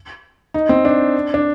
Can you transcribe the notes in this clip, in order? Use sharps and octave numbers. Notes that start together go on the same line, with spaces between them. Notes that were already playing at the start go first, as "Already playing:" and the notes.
D#4
C4
D4
D4